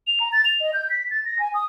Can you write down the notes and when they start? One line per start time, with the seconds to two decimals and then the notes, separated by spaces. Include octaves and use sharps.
0.07 F7
0.20 A#5
0.32 A6
0.45 F7
0.60 D#5
0.73 G6
0.90 B6
1.11 A6
1.25 A#6
1.39 G#5
1.54 D#6